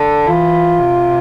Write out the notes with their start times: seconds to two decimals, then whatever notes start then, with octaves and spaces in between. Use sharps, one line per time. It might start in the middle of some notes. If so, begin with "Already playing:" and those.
Already playing: D3 A4
0.27 E3 F4
0.78 C3